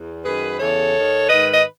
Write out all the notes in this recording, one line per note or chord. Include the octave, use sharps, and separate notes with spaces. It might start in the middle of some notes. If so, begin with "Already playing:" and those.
Already playing: E2
F#2 D#3 G#4 B4
E2 C#3 E3 A4 C#5
D#2 D#3
G#2 D#3 B4 D#5
D#5